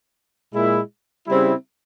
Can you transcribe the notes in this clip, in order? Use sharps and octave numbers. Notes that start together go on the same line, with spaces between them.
A#2 G#3 E4
C#3 G3 C4 E4